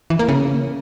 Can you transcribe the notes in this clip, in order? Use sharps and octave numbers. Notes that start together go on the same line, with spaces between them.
E3
A#3
C#3